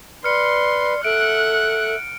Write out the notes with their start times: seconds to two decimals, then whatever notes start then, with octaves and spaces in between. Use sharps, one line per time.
0.24 B4 D5 C6 F6 C#7
1.04 A4 E5 F#5 F#6 D7